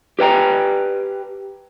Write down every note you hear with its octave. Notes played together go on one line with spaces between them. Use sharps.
G4 B4 G5 A#5